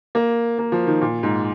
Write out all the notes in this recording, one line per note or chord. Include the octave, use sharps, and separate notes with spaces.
A#3
A#3
F3
D#3
A#2
G#2